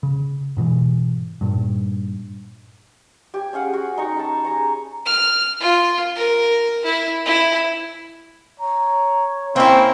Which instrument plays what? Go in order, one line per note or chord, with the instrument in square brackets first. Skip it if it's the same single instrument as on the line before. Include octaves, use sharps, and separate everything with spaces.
[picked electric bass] C#3
G#2 B2 D#3 E3
G2 A#2
[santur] G4 G#5
C#4 G#4 F5 F#5
F#4
D#4 G4 A#5 C#6
A5 B5
G#4 A#5 C#6
[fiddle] F6
F4
A#4
E4
E4
[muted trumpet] C#5 [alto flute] A#5
[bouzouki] A#3 E4 [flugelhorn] C4 [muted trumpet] C#4 [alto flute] C#6